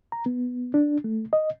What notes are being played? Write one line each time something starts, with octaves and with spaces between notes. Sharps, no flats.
A#5
B3
D4
A3
D#5